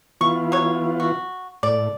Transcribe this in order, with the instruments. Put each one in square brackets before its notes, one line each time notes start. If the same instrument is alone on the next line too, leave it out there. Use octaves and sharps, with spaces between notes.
[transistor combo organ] E3 B3 F4 [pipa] C#6
[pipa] F#3 C#5
F#4
[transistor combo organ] A2 [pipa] D5